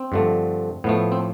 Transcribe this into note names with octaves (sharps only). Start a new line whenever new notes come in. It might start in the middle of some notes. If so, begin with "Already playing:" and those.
Already playing: C4
G2 D3 F3 A3
A2 F3 A3 B3
C4